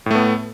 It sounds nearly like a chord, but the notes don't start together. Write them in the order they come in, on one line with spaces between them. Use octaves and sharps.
A2 A3 B3